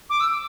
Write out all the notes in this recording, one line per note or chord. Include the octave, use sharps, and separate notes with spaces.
D6
E6